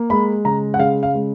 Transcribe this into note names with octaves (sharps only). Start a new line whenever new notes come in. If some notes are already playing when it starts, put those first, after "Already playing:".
Already playing: A#3
G#3 B5
C#3 A#5
F#5
C#3 F5
F5
G#3